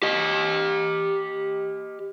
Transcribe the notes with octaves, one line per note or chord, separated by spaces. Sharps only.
G4 D#5